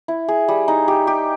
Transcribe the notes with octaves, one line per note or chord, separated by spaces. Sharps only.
E4
G#4
G3
D#4
G4
G4